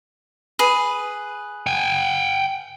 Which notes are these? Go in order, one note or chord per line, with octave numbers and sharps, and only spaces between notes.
G#4 B4
G5 G#5